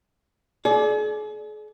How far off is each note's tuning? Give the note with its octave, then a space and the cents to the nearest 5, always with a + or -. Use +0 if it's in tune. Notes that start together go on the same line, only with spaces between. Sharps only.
G#4 +40 D5 +0